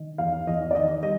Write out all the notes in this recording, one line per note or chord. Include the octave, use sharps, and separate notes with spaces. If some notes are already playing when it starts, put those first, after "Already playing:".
Already playing: D#3
E2 F5
E2 D#5
D5
D#3 D#5
G3 D#5